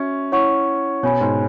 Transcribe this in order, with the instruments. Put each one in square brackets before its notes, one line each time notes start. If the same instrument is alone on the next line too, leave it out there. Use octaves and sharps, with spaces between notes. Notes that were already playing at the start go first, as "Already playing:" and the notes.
Already playing: [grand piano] C#4 [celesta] F#4 E5 C#6
[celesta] E4 C#5 F#5 C#6
[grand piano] B2 [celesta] C#5 G#5 B5
[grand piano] G#2